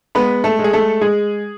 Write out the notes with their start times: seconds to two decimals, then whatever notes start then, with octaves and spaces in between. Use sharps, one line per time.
0.15 G#3 B3 B4
0.44 A3 A4
0.59 G#3
0.64 G#4
0.73 A3 A4
1.01 G#3 G#4